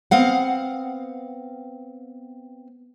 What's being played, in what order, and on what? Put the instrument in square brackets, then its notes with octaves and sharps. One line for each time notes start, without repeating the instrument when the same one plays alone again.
[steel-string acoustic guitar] B3 C4 F5 F#5